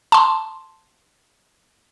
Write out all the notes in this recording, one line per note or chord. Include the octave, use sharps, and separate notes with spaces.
A5 C6